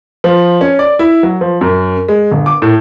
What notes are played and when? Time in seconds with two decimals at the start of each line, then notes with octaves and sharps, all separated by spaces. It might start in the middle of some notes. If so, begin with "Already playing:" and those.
0.24 F3
0.61 C#4
0.79 D5
0.99 E4
1.23 F#3
1.41 F3
1.61 F#2
2.08 G#3
2.31 G1
2.46 D6
2.62 A2